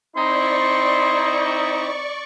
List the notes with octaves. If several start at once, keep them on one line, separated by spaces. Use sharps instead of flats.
C4 D#4 E4 D5 C6 C#6